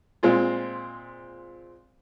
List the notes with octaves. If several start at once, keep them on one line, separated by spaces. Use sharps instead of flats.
A#2 G#3 C4 F4